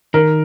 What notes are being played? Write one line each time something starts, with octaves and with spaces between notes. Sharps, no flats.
D#3 A#4